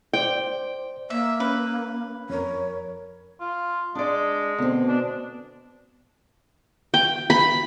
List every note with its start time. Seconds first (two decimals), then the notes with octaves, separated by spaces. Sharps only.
0.13 C5 D5 G5
1.10 A#3 E5
1.40 C#4 B4 F#6
2.30 F2 A#4 C#5
3.40 F4
3.95 G#3 D4 D5
4.58 D2 B2 C4
4.88 D4
6.94 G5
7.30 B5